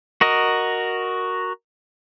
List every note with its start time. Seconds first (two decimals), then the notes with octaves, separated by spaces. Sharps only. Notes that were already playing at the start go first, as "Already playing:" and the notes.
0.21 F#4 A#4 D#5